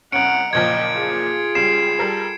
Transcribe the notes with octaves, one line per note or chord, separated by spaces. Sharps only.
C2 C#4 F#5 A#5 C#7 D7
F#1 A#2 F3 D#5 G5 G#6
F4 G#4
C#2 G3 C7 E7
G3 A4 A#4